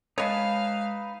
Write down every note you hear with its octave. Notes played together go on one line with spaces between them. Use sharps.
G#3 D#4 B4 C#5 D#5 F5 A5